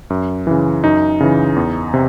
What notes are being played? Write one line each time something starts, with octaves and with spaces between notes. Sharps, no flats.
F#2
C#3 E3
F#2 D#4
C#3 E3
E2
C3